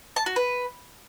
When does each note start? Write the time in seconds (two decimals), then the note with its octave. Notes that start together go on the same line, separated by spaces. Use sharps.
0.16 A5
0.26 F#4
0.36 B4